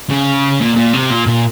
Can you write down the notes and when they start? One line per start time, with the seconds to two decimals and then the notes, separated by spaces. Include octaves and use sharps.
0.10 C#3
0.61 A#2
0.76 A#2
0.93 C3
1.10 A#2
1.27 A#2